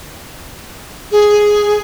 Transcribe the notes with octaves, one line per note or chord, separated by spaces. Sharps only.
G#4